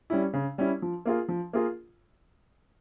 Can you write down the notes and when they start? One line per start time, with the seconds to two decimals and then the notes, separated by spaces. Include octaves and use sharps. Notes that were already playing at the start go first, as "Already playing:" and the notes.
0.10 G3 C#4 E4
0.33 C#3
0.58 G3 C#4 E4
0.82 F3
1.05 A#3 F4 G#4
1.28 F3
1.53 A#3 F4 G#4